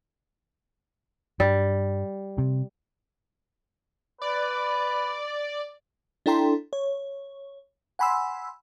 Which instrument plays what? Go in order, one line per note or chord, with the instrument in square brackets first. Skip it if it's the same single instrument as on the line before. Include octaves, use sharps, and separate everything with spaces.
[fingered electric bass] G2 [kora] G3
[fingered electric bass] C3
[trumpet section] B4 [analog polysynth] D5
[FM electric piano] D4 E4 A4 G5 A#5 C6
C#5
F#5 G#5 B5 C6 E6